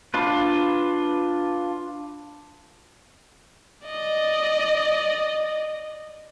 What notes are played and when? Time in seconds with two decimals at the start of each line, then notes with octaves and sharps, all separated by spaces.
0.14 D4 F4 B4
3.86 D5 D#5